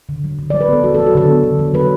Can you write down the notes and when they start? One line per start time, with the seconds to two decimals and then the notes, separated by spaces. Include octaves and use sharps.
0.09 D3
0.24 F#3
0.39 D3
0.50 D5
0.54 F#3
0.61 B4
0.69 B3 A4
0.84 F#3 F#4
0.94 A4
0.99 F#3
1.06 F#4
1.15 D3 A4
1.29 B3
1.44 D3
1.59 F#3
1.74 F#3 B4